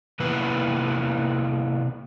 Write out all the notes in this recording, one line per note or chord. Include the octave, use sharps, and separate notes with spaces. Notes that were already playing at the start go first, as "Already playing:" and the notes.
C3 A#3 B3 E4 B4